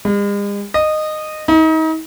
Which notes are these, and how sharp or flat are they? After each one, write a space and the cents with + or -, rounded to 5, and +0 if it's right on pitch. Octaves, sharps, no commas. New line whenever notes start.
G#3 -45
D#5 -15
D#4 +35